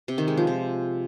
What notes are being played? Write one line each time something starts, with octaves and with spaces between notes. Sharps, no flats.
C3
D#3
G#3
F3
C3